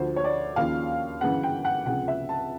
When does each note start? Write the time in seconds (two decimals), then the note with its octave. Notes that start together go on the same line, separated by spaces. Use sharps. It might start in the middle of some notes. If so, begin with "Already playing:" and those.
Already playing: D2 D3 F3 C5
0.16 C#5
0.24 D5
0.56 D#2 C#3 F3 F5
1.21 G1 F#2 C#3 E3 F#5
1.43 G5
1.65 F#5
1.86 C#2 C3 F3 F#5
2.08 E5
2.29 A5